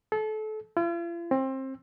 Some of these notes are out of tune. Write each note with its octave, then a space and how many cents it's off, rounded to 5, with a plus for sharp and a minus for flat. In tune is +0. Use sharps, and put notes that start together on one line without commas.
A4 -30
F4 -45
C4 +25